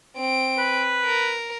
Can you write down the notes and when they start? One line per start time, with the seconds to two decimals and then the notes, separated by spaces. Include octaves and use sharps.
0.17 C4 D7
0.59 B4
1.04 A#4